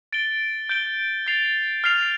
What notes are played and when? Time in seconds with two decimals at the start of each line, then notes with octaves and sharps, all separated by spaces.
0.13 A6 D7 G7
0.69 G6 D7 G7
1.27 A6 C7 F7
1.84 F6 C7 F7